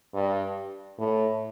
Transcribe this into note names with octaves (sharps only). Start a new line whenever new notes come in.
G2
A2